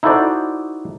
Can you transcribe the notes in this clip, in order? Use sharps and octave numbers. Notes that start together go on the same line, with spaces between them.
D#4 E4 F#4 A4 C5 D5